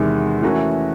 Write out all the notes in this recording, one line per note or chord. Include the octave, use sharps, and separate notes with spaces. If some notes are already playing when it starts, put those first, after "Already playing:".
Already playing: E2 C3 D#3 G#3
E3 A3 C#4 F#4 A#4